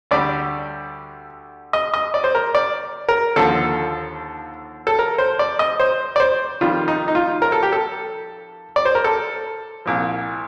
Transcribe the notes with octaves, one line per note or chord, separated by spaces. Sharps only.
D2 D3 G3 D5
D#5
D#5
D5
C5
A#4
D5
A#4
D#2 D3 F3 A4
A4
A#4
C5
D5
D#5
C5
D5
C5
F2 D#3 G3 F4
D#4
D#4
F4
A#4
A4
G4
A4
D5
C5
A#4
A4
C2 A#2 F3